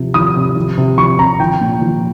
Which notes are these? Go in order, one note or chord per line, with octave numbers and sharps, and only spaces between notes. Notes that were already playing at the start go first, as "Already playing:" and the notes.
Already playing: C3 F3
F3 D#6
C3
F3
C3
F3 C#6
C3 A#5
F3 G5
A#2
F3